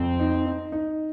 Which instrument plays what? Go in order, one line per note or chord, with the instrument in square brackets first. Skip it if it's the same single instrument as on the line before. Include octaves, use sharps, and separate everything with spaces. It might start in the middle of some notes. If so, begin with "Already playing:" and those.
Already playing: [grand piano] F2 [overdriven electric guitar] C4
[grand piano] D#4
D#4
D#4